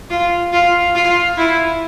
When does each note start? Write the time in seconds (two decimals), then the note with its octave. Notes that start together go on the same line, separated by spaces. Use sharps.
0.10 F4
0.53 F4
0.95 F4
1.37 E4